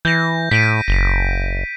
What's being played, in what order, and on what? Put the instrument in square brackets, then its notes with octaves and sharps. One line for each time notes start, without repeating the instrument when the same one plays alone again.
[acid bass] E3 [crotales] G6 A#6
[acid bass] A2 [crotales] B6 D7 D#7
[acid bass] F#1